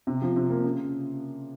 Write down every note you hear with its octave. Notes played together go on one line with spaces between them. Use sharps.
C3
F3
C3
A#3
C#3